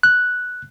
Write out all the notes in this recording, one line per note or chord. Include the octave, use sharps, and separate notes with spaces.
F#6